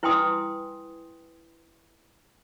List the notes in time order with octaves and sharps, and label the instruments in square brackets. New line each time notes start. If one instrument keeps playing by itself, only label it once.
[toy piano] E4 B4 G5 G#5 C6 D#6